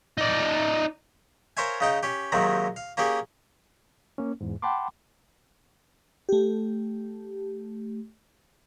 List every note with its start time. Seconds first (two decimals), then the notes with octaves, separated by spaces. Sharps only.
0.18 D#4 D5
1.57 A#4 C5 C#5 E5 F5 G#5
1.80 C#3 D#4 G5
2.03 C#4 G4
2.32 D#2 C3 D#3 F#3 G#3
2.76 F5
2.97 A#3 C#4 G4 G#4
4.18 A#3 C#4
4.41 E2 G#2
4.62 F#5 G5 A5 B5 C6 D6
6.29 A3 G4